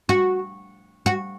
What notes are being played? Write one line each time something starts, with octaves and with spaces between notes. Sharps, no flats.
F#4
F#4